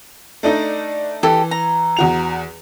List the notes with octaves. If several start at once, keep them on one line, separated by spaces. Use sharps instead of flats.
A3 D4 D#4
E3 G4 A4
A#5
E2 F#4 F7